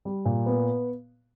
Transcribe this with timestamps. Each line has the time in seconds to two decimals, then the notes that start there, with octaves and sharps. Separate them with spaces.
0.05 G3
0.25 A#2
0.46 B3